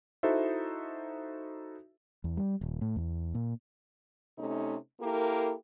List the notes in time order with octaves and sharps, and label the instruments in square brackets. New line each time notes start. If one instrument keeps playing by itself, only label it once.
[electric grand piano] D#4 E4 F#4 A4 C5 E5
[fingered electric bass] E2
G3
D#1
A2
E2
A#2
[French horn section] C3 A3 C#4 D#4
A#3 E4 G4 A4 A#4